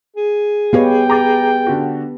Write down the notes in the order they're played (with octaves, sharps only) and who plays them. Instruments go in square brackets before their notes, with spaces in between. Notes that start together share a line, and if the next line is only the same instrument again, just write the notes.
[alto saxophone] G#4
[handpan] B3 G4 B4 [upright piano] C#5 D#5 F5 [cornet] G5
[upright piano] A#5 D6 A6
D3 F#4